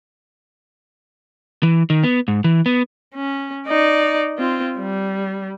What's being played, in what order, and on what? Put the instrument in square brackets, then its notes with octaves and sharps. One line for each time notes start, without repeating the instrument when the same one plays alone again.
[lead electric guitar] E3
D#3
B3
G#2
E3
B3
[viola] C#4
D#4 D5
C4 F4
G3